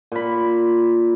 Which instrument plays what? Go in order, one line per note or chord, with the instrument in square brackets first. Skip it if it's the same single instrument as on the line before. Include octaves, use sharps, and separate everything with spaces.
[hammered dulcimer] A#2 B5